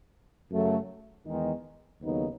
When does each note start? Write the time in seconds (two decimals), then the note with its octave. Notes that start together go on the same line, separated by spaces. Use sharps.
0.51 F#2 C#3 F#3 A3
1.26 E2 D#3 G#3 D#4
2.01 D#2 C#3 F#3 B3 D#4